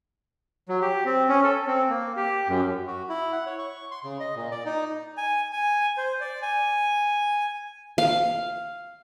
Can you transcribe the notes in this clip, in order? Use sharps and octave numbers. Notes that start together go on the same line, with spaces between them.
F#3
G4
C4
C#4
A4
C4
A#3
G4
F#2
F#4
E4
F#5
C#5
C#6
C6
C#3
D#5
A#2
D5
D#4
G#5
G#5
C5
D5
G#5
F5